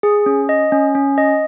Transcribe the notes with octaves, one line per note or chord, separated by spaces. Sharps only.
G#4
C#4
D#5
C#4
C#4
D#5